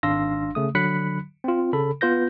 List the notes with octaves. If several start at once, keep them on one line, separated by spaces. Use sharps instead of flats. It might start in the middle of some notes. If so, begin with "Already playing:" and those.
G#1 D4 F5 C6 E6 A#6
C#3 A3 D#6
D3 F#3 B5 F#6 B6 C#7
C4 F4
C#3 A4 B5
B3 F4 B4 G6 A#6